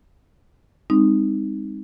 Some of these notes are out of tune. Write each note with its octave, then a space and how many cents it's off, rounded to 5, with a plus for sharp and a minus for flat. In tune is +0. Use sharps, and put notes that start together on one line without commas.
G#3 -45 C4 +0 D#4 +0